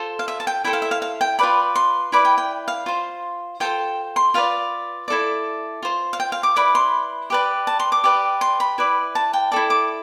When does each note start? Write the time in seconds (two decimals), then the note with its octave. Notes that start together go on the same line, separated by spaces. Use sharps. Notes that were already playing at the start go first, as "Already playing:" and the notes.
Already playing: F4 A4 C5
0.19 F5
0.28 E5
0.40 A5
0.47 G5
0.64 E4 A4 C5 G5
0.73 F5
0.82 E5
0.91 F5
1.02 F5
1.21 G5
1.39 F4 B4 D5 B5
1.75 C6
2.12 E4 B4 D5 B5
2.25 G5
2.38 G5
2.68 F5
2.86 F4 C5
3.60 F4 A4 C5 G5
4.16 C6
4.34 F4 B4 D5 F5
5.08 E4 A4 D5
5.83 F4 C5
6.13 F5
6.20 G5
6.32 F5
6.43 D6
6.56 E4 B4 D5 B5
6.75 C6
7.30 G4 B4 D5
7.67 A5
7.80 C6
7.92 D6
8.04 G4 B4 D5
8.41 C6
8.60 B5
8.78 E4 B4 D5
9.15 A5
9.33 G5
9.51 E4 A4 D5 A5
9.70 D6